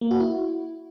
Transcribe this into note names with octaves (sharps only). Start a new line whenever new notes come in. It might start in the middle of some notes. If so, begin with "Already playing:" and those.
A#3
F#4
E4